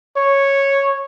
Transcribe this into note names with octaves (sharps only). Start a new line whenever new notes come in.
C#5